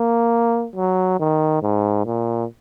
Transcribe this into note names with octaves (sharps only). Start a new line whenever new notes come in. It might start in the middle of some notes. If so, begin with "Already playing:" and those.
Already playing: A#3
F#3
D#3
G#2
A#2